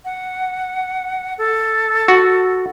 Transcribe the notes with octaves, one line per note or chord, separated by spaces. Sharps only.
F#5
A4
F#4